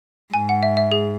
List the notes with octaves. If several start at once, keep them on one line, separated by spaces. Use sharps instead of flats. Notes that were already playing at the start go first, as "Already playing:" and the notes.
G#2 G#5
F#5
E5
E5
G#4